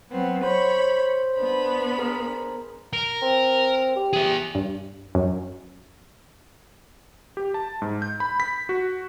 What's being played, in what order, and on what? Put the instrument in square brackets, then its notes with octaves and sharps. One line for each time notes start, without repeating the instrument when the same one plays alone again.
[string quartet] F#3 B3 C4
[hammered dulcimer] C5 [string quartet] C#5 B5
[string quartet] B3 D4 B5
[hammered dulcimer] G#4 A#4
[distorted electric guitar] A#4
[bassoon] C4
G4
[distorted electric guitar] G#4 E5
[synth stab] G2
F#2
[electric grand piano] G4
A5
G#2
G6
B5
B6
F#4